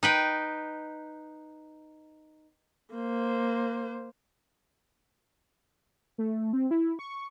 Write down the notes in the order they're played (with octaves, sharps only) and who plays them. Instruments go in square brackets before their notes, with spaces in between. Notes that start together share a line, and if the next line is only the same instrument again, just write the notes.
[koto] D#4 B4 G5
[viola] A#3 C5
[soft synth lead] A3
C4
E4
C#6